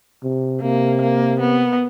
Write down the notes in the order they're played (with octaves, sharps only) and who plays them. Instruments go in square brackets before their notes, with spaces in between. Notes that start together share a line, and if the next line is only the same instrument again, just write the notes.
[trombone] C3
[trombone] C3 [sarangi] A#3
[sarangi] A#3
B3